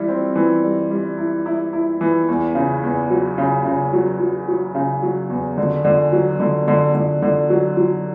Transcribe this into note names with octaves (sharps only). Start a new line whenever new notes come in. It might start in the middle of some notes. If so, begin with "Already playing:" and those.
Already playing: E3 G3 E4
C4
E3
G3
G3
E4
E4
E4
E3
E2
C#3
E2
F#3
C#3
C#3
F#3
F#3
F#3
C#3
F#3
E2
D3
D3
F#3
D3
D3
D3
D3
F#3
F#3